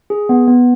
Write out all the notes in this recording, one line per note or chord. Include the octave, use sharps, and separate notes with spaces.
G#4
B3
B3